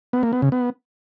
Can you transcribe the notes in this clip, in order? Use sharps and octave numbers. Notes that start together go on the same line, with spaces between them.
B3
A#3
B3
C#3
B3